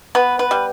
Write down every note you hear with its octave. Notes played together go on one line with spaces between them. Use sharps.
B3 B4
B4
G3